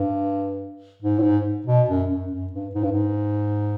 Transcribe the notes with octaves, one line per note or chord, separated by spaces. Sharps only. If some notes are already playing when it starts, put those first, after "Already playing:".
Already playing: G2
G#2
A2
G#2
B2
F#2
F#2
F#2
G2
G#2
G2
G#2